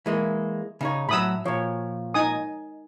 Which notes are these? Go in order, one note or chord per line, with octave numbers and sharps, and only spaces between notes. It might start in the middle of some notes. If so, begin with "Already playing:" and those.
E3 G#3 A#3
C#3 D#4 C#5
A2 F#3 B5 D#6 E6
A#2 F3 C#5
D#4 G#5 D#6